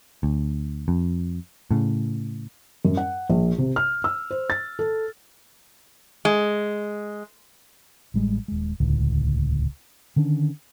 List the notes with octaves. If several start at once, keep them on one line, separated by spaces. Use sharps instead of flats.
D2
F2
A2 C#3
F#2
F#5
A#1
C3
F6
E6
C5
A6
A4
G#3
A1 G3 G#3
D#1 G#3
D#1 C#2 A2 D3
D3 D#3 C#4 D4